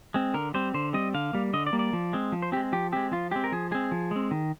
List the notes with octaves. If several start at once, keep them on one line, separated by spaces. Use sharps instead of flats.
G#3 C4
D3 A#4
G3 C4 C5
D3 C5
G3 C4 D#5
D3 F5
G3 A#3
D3 D#5
D5
G3 A#3
D5
F3
G#3 C4
F3
C5
G#3 C4 G4
F3 G4
G#3 C4 G4
F3 F4
G#3 C4 G4
A#4
F3 G#4
G#3 C4 G#4
F3
G#3 C4
D#3